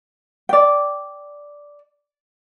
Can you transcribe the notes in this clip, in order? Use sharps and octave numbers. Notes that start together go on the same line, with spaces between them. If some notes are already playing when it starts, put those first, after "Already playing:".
D5 G5